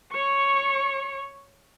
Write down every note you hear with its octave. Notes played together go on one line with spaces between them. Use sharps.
C#5 C#6